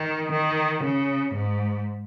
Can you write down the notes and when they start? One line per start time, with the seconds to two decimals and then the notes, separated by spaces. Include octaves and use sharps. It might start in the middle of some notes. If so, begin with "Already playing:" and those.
Already playing: D#3
0.32 D#3
0.83 C#3
1.34 G#2